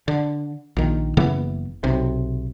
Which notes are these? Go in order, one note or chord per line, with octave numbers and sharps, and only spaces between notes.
D3
A#1 D#3
F#1 C#3 E3 B3
B1 C3